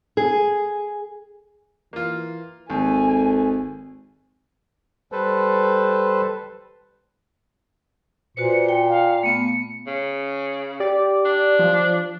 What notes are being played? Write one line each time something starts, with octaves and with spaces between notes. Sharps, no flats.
G#4
E3 A#3 F4
G#1 D#2 A4 G#5
G3 A4 B4 C5
A#2 F#4 B4 C5 C#7
G5
F5
A3 B3 C#7
C#3
G4 D5
D4
F3